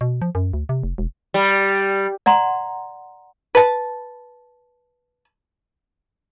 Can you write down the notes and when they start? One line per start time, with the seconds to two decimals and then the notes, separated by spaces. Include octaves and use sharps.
0.01 B2
0.22 F3
0.35 F#2
0.53 D2
0.69 C3
0.83 F1
0.98 E1
1.34 G3
2.26 D5 F#5 A#5 C6
3.55 B4 A5